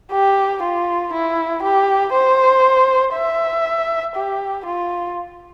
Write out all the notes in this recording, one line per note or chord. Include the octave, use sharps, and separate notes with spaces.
G4
F4
E4
G4
C5
E5
G4
F4